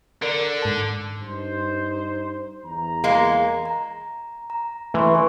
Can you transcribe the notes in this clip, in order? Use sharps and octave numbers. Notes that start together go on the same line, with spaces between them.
D3 A#4 D5
G#2 A5
G2 D#4 C5
E2 A#5
G#3 A#3
A#5
A#5
E3 A3 C6 C#6
E4 B4 G#5